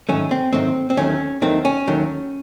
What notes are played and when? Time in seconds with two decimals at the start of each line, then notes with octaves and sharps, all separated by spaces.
0.09 G#2 D#3 F#3 A3 C#4
0.31 C4
0.53 G#2 D#3 F#3 A3 C4
0.90 C4
0.97 D#2 D#3 F#3 A3 C#4
1.42 D#2 D#3 F#3 A3 C4
1.65 C#4
1.87 D#2 D#3 F#3 A3